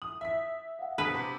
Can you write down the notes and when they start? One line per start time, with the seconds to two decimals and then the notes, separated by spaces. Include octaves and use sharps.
0.02 D#6 F#7
0.21 E5 B6
0.79 F5 F#5
0.98 B2 D4 B4 C5 D#6 B6
1.15 C3